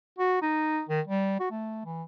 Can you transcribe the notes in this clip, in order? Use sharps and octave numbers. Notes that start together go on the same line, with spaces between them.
F#4
D#4
D#3
G3
F#4
A3
E3